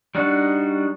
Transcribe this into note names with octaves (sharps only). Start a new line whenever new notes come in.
G3 D4 D#4 F#4